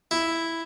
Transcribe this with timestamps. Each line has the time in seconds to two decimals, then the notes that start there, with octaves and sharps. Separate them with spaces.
0.11 E4